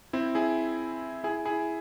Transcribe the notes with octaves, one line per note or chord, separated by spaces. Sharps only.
C4 E4
E4 G#4
E4 G#4
E4 G#4